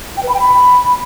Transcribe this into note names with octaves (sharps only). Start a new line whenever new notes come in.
G5
B4
B5
G5
B5